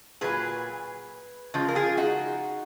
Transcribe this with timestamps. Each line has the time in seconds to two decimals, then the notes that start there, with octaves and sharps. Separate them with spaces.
0.21 A#2 F#3 G#4 B4
1.54 C#3 F3 G#3
1.68 A#4
1.75 F4 G#4
1.97 D#4 F#4